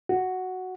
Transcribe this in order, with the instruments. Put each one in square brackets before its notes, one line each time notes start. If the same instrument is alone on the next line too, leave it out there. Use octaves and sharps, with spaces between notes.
[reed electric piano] F#4